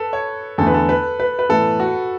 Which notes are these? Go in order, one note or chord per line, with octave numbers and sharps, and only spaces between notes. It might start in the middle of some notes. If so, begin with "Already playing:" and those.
Already playing: A4 B4
C#5
E2 D3 A3 A4
B4
A4
B4
B4
B4
A2 E3 B3 A4
F#4